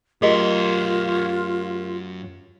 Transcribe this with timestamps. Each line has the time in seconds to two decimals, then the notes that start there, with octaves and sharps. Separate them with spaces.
0.22 F#2 A3 F4 G4 G#4 A#4 D#5 C6